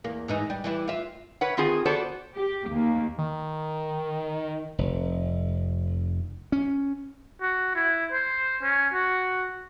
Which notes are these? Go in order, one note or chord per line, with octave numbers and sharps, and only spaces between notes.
E2 A#3
G#2 E3 D#4
G3
E3 G3 E4
F4 E5
B4 C#5 F#5
D#3 C4 F4 G#4
B3 F#4 A4 C5 D5
G4
D#2 A#3
D#3
F1
C#4
F#4
E4
C5
C#4
F#4